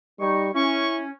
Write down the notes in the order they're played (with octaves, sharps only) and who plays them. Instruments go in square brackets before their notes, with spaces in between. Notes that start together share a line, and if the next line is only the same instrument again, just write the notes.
[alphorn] G3 [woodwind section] D#4 C#6
[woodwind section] C#4 [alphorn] E4 [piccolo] C#6